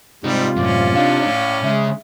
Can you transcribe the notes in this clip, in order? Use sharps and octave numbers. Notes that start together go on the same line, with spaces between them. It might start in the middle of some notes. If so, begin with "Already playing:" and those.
C3 G3 G#3 D#4 F4
F#2 A2 C#4 D5 F5
D4 D#4 F5
A2
C#3 G#3 G#4 E5